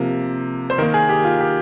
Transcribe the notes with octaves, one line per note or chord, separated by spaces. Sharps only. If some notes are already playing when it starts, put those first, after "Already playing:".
Already playing: C3 F3 A#3
C5
D#3 A#3 A#4
G#4
G4
F4
G4